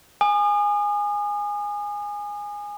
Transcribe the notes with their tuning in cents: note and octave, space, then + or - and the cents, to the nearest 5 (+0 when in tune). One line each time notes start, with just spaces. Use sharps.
G#5 -10 D#6 -40